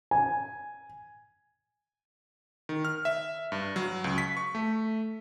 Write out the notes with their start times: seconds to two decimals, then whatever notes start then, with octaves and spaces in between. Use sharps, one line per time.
0.11 G#5
2.69 D#3
2.85 F6
3.05 E5
3.52 G2
3.76 F#3
4.04 C#2
4.18 B6
4.37 C#6
4.55 A3